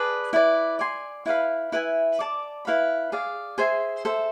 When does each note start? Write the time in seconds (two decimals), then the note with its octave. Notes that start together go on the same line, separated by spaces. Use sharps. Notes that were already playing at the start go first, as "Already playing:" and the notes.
Already playing: G#4 B4 D5 A5
0.33 E4 B4 D5
0.79 D5 G#5 C6
1.26 E4 B4 F5 B5
1.72 E4 B4 E5 G#5
2.19 D5 A5 D6
2.65 E4 B4 F5 B5
3.12 G#4 D5 F5
3.58 G#4 C5 E5 G#5
4.05 A4 C5 E5